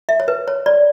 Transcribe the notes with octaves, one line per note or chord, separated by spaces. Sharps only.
E5
C#5
B4
C#5
D5